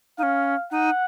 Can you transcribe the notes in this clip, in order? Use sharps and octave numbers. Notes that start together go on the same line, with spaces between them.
C#4 D#4 F5
D#4 F#5